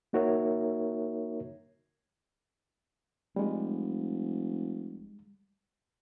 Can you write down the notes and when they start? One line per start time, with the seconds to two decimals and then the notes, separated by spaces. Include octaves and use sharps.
0.13 A#3 D#4 F#4 A#4 C#5 E5
3.36 F1 G3 G#3